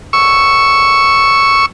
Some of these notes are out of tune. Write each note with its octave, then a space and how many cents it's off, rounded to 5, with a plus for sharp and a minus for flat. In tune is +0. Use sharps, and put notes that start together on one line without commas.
C#6 +0 E6 +0